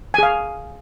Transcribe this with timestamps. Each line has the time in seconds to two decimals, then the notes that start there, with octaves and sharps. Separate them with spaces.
0.14 G#5
0.18 G#4
0.23 F5